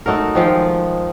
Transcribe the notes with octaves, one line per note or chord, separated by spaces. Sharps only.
A3 D#4 F#4 A#4
D#3 F3 G#3 G5